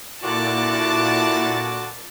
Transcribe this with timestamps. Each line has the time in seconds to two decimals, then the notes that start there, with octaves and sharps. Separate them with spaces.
0.22 A#2 D3 D4 E4 F#4 A5 D6 A6